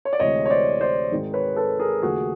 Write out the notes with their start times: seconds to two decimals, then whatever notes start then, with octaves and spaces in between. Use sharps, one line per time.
0.05 C#5
0.13 D5
0.20 D2 C3 E3 G#3 C#5 D#5
0.46 C#5
0.50 C5 D5
0.81 C5 D5
1.11 G#1 G#2 D#3 G#3
1.34 B4 C#5
1.56 A4 B4
1.79 G#4 A#4
2.02 D#2 C#3 F3 A3 F#4 G#4